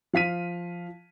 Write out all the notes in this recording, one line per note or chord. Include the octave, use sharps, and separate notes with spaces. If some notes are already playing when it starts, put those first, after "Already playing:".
F3 F5 B6 D#7